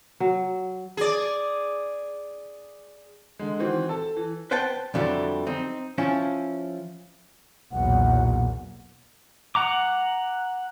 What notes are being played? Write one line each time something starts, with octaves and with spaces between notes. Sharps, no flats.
F#3
G#4 D5
D3 G#3
D#3 E3 C4 F#4
A4 A5
E3
B4 C5 F#5 G5 A5
F2 D3 F#3 G3 E4
C4 D#4
F3 C#4 E4
B1 E2 A#2 F#5
F#5 A#5 D6